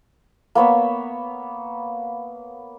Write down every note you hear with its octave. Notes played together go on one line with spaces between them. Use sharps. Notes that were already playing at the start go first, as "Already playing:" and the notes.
A#3 B3 C#5 E5